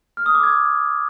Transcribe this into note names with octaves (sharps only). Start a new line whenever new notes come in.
F6
D#6
D6
G#6